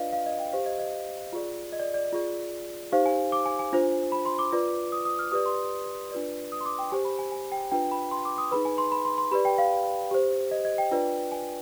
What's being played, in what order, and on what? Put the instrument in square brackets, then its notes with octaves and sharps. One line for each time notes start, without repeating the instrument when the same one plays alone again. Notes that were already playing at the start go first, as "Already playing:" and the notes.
Already playing: [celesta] D4 F4 B4 D5 D#5 F5
F5
D#5
G5
G4 C5 F5
D#5
D#5
F4 G#4 D5
D#5
D5
D5
F4 G#4 D5
D#4 G4 C5 F5
G#5
D6
G#5
G#5
D4 F4 C5
B5
C6
D6
F4 B4 D5
D#6
D#6
F6
G4 B4 D5 D#6
C6
D4 F4 B4 D5
D#6
C6
D6
G5
G4 C5 G#5
B5
G#5
G#5
G5
D4 F4 B4 G5
B5
C6
D6
D#6
D#4 G#4 B4 B5
G#5
C6
B5
C6
C6
G4 B4 D5 B5
G5
F5
G4 C5
D#5
D#5
G5
D4 F4 B4 D5
G#5